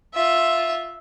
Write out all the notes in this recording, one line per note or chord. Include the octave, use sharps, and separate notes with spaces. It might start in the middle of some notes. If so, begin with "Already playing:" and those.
F4 E5